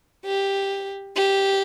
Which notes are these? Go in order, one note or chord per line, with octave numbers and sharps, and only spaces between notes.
G4
G4